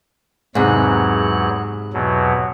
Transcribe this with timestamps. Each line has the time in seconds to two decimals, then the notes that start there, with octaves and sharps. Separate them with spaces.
0.55 E2 G#2 C3 F#3 F#6
1.93 E2 B2 F#3